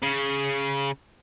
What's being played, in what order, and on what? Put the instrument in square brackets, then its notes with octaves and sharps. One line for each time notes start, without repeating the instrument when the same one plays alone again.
[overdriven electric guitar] C#3